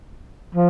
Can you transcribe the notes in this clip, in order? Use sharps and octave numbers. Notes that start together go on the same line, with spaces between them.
F3